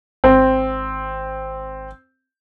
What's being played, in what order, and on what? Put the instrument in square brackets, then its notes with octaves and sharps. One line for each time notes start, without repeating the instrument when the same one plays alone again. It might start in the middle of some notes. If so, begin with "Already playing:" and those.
[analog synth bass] G#1 [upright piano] C4